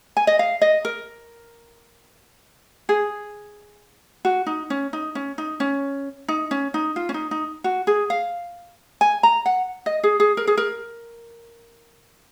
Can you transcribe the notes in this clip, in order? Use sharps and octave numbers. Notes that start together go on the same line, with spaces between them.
G#5
D#5
F5
D#5
A#4
G#4
F#4
D#4
C#4
D#4
C#4
D#4
C#4
D#4
C#4
D#4
F4
C#4
D#4
D#4
F#4
G#4
F5
G#5
A#5
F#5
D#5
G#4
G#4
A#4
G#4
A#4